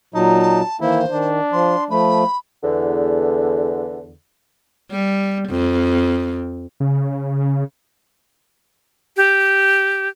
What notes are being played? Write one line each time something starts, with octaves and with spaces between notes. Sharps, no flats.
A#2 F#3 D#4 A5
D#3 E3 A#3 E4 C5
D#3 D4
F3 C6
F3 A3 B5
E2 D3
G3
F2
C#3
G4